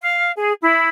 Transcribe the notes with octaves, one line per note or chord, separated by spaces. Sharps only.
F5
G#4
E4